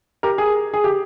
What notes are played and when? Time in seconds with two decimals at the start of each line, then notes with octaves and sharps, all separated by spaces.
0.23 G4 A#4
0.38 G#4
0.74 G#4
0.84 G4